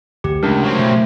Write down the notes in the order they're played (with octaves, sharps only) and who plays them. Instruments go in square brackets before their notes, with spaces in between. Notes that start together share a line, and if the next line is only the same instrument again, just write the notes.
[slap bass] D2 [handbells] G4
[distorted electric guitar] C#2 [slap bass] C#3 G#3 A3 [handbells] D4 E4 A#4
[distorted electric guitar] F#3 C4
[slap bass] B2 [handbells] A3